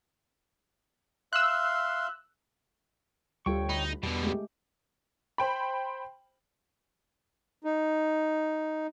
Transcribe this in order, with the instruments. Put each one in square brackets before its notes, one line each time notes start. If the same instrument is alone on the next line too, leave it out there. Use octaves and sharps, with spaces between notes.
[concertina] E5 F5 C6 [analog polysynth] E6 F#6
[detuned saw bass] D2 [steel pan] G3 F4 A4 [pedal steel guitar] C#5 G5 C#6
[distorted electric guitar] D#4 [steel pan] B5
[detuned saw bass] E2 [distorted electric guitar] B2 D3 [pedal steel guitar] G3 B3
[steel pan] G#3 A3 G4
[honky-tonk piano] C5 G5 B5
[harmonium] D#4